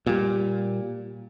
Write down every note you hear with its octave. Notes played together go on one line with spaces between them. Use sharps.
A#2 G3